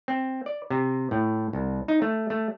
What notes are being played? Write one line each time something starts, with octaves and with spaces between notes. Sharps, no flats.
C4
D5
C3
A2
C2
D#4
A3
A3